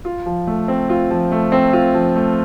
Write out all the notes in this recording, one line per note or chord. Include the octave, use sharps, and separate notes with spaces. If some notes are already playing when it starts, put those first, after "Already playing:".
F4
F3
A3
C4
F4
F3
A3
C4
F4
F3
A3